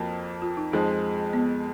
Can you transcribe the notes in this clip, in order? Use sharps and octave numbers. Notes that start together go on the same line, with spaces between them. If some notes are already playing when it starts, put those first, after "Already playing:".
Already playing: F2 F3 A#3 F#4
F4
D#4
F2 F3 G#3 D#4
B3